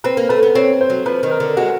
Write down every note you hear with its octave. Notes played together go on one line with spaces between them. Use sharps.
C4 B4
A#3
A3 B4
B3
C4 C#5
C5
F#3
F3 B4
D#3
A#4
D3
G#3 F#4